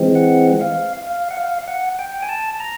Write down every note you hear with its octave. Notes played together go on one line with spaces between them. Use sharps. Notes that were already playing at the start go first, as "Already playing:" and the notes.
Already playing: E3 G#3 C4
F#5
F5
F5
F#5
F5
F#5
G5
G#5
A5
A#5